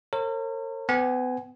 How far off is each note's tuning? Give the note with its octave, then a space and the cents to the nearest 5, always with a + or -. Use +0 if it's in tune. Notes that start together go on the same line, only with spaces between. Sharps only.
A#4 -40 C#5 -45
B3 +35 G#5 +0